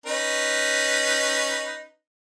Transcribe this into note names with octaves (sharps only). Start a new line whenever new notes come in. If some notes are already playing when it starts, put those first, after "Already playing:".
C#4 D#4 B4